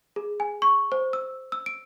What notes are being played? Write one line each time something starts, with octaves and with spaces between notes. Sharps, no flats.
G#4
G#5
C#6
C5
E6
E6
D7